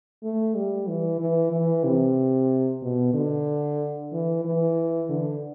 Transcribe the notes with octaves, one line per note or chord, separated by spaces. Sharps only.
A3
G3
E3
E3
E3
C3
B2
D3
E3
E3
D3